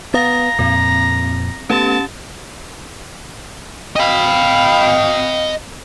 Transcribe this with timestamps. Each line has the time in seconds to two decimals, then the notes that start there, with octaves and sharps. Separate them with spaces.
0.14 B3 F5 A#5 D#6 A6
0.59 F2 A#2 C4
1.70 A3 B3 C#4 G4 A5
3.96 D#5 F5 G5 B5